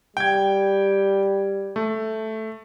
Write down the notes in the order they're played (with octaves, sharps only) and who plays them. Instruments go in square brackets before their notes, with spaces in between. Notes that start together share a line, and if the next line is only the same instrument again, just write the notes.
[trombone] G3 [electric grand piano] G5 G#6
[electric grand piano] A3